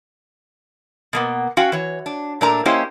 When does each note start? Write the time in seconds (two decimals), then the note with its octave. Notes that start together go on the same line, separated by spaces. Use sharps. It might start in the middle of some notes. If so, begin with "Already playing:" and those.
1.13 B2 A#3 B3
1.57 C#4 F#4 F5 G5
1.72 E3 C#5
2.06 D4
2.41 A#2 A3 D4 A#4 A#5
2.66 A#3 C#4 E4 G4 C5 D#5